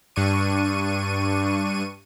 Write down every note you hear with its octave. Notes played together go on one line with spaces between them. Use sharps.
G2 D4 C#6 D#7